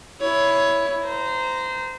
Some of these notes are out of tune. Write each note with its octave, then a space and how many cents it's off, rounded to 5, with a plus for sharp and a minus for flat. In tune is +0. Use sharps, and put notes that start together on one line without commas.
E4 +0 C#5 +15
C5 -25 A#5 +0